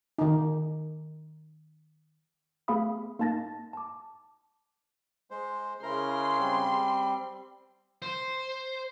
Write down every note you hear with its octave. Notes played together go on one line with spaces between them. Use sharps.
D#3 D#4
A3 B3 G#4 F5 B5 D#6
A#3 D#4 A5 A6 A#6
A5 D6
G#3 C5
C#3 E4 A#4 A#5 C6
G3 C4
C5